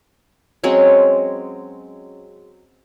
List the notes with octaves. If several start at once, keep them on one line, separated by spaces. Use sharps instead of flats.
F#3 G#3 C4 C#4